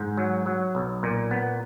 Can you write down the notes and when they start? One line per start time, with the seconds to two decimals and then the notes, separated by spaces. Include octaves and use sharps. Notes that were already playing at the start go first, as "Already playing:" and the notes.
Already playing: G#2
0.17 F#3
0.46 F#3
0.75 B1
1.03 A#2
1.31 B3